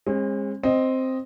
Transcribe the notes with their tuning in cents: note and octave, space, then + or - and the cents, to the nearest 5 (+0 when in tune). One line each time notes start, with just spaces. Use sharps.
G#3 -25 C4 +45
C4 +0 D#5 +0